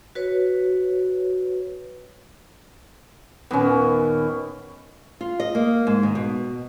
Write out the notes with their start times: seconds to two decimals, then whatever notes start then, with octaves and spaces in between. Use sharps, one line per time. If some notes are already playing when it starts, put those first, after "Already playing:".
0.15 F#4 B4 C#5
3.51 D#2 A#2 B3 C#4
5.21 F4
5.40 D#5
5.55 A#3
5.87 G#2
6.03 D#3
6.15 B2